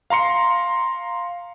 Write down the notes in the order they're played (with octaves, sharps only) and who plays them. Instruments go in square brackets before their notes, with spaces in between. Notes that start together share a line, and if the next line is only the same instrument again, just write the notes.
[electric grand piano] F5 A#5 C6 C#7